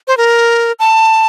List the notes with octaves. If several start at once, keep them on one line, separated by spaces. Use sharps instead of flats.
C5
A#4
A5